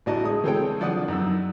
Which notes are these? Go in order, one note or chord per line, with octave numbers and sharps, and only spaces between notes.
A1 A2 D4 F#4 D#5 A5
G#3 D#6
E3 G#3 C4 A4 C#5 G5
D3 F3 D5 F#5 D#6
F#2 D#4 E6